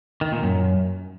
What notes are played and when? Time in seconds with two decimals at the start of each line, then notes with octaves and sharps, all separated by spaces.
0.21 D#3
0.32 A#2
0.43 F#2